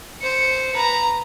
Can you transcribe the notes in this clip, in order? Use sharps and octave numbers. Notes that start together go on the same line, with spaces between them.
C5 C#7
B4 A#5